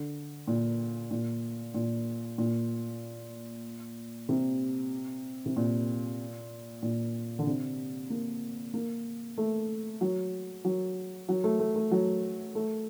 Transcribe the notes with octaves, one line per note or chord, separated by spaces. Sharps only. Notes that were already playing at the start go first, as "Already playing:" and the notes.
Already playing: D3
A#2
A#2
A#2
A#2
C3
C3
A#2
A#2
D3
C3
A#3
A#3
A3
F#3
F#3
F#3
A3
A3
A3
F#3
A3